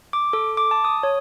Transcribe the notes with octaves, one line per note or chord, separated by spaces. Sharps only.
D6
A4
D6
A5
D#6
C#5